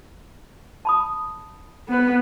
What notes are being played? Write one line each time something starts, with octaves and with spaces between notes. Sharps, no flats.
A5 B5 D#6
B3 B4